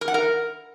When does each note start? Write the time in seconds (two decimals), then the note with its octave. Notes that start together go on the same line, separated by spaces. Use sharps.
0.01 A#4
0.08 F#5
0.14 A#4